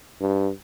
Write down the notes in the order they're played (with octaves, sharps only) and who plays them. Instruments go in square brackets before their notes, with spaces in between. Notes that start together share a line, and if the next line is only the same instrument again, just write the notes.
[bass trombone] G2